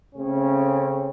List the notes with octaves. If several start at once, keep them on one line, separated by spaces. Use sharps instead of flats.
C#3 A3 C4 C#4